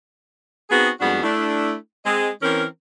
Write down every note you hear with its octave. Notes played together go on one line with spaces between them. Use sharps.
B3 C4 D#4 F#4 G#4
F2 G3 G#3 B3 D4 F#4
A3 D4 E4
G#3 C4 D#5
E3 C4 C#4 A#4